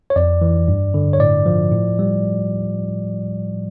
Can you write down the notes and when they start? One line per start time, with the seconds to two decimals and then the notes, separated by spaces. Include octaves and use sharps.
0.10 C#5
0.16 F2 D5
0.41 E3
0.68 G2
0.94 D3
1.13 C#5
1.20 A2 D5
1.46 F3
1.72 A2
1.99 G3